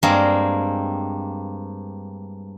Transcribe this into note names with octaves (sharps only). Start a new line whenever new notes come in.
G2 G#3 A#3 C4